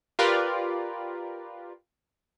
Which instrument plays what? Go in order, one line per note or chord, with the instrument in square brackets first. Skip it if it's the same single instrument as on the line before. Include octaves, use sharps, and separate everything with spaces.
[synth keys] F4 G4 A#4 B4 D5